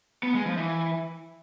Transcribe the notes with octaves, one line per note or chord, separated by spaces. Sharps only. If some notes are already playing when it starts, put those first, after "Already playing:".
B3
G#3
F3
E3